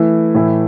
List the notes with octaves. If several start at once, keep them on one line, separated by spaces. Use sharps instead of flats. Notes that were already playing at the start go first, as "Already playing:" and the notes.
Already playing: E3 A3 E4
A2 E3 A3 E4